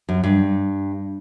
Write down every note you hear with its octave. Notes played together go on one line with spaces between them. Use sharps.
F#2
G2